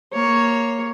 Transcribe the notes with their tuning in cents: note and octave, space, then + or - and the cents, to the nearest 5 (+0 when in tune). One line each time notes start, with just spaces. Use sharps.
A#3 +0 C#5 +0